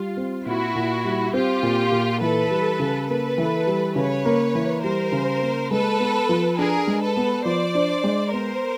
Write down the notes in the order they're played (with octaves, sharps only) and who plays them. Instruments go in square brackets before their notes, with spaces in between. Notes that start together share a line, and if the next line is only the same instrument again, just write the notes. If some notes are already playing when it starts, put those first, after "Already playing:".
Already playing: [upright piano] G3 [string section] F4
[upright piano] C4
[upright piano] A#2 [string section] E4 F#4
[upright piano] A#2
G3
[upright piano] C4 [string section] F4 G4
[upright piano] A#2
A#2
[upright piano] E3 [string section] A4 B4
[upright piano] G3
C#3
[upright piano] A#3 [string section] A4 B4
[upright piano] E3
G3
[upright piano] C#3 [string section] B4 C#5
[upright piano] A#3
E3
[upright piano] G3 [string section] A#4 C5
[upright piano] C#3
A#3
[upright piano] G#3 [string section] A4 B4
[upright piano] B3
F3
[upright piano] D4 [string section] G#4 A#4
[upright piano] G#3
[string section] A4 B4
[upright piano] B3
[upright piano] F3 [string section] C5 D5
[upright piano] D4
G#3
[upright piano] B3 [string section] A#4 C5